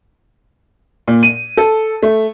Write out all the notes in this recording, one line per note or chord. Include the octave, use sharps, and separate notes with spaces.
A#2
D#7
A4
A3